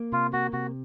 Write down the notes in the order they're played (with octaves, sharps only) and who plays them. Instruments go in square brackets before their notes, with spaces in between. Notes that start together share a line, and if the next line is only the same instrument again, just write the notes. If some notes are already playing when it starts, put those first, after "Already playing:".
Already playing: [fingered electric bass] A#3
[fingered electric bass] C3 [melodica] F4
[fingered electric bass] A#3 [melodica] F#4
[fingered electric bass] C3 [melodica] F#4